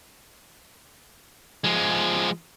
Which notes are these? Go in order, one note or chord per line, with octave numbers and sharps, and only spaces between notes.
F3 G#3